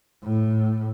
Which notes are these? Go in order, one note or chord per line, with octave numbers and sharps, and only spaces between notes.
A2